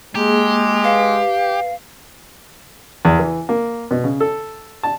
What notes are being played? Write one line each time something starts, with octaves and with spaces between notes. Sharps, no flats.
G#3 A#3 G4 G#4
B4 F5
E2
E3
A#3
B2
C#3
A4
A5